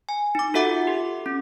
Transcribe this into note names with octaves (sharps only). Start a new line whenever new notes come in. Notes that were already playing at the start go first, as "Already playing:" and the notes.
G#5
D#4 D6
F4 F#4 A4 E5 F#5 D6
G4
C#4